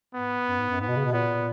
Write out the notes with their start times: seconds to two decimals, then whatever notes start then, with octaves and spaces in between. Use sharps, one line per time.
0.14 G#2 B3
0.48 F#2
0.58 G#2
0.70 F#2
0.80 G#2 B3
0.88 B2
0.96 C#3
1.05 B2
1.13 A#2 B3